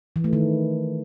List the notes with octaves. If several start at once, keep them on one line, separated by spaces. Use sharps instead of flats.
E3
A3
D#3